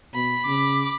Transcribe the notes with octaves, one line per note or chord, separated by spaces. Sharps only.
B2 B5
C#3 D6